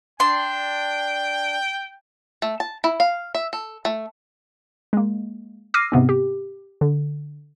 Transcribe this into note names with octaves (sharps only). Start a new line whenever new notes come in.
D4 G5 C6
A3
A5
E4
F5
E5
A4
A3
G#3 A#3
D6 E6 F6 A#6 C7 D#7
G#2 C3 B3 C4
G4
D3